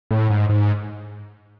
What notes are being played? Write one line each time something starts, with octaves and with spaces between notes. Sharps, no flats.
A2
G#2
G#2